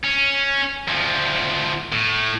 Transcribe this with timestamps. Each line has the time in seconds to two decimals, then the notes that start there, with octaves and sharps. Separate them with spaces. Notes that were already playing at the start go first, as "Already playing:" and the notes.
0.04 C#4
0.88 D2 F3
1.92 A2